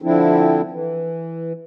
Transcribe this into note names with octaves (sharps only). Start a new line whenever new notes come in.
D3 F3 C4 D4 E4
E3